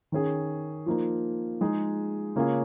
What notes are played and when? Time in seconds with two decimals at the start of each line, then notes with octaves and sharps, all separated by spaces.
0.12 D#3 C#4 G#4
0.86 F3 A#3 D#4
1.61 F3 G#3 D#4 G#4
2.36 C#3 A#3 C#4 F4 G#4